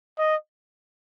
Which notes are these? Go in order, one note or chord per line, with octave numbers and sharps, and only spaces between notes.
D#5